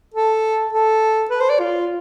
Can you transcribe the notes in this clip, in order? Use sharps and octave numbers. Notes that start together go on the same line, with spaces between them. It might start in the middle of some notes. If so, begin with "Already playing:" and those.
A4
A4
B4
C5
D5
F4